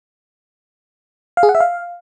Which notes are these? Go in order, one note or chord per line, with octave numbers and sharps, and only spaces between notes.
F5
G#4
F#5
E5
F5